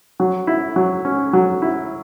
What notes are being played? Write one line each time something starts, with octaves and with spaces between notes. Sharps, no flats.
F#3
E4
F#3
C#4
F#3
E4